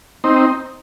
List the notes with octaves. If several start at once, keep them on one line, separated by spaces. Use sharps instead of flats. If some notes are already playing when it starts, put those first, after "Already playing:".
C4 D#4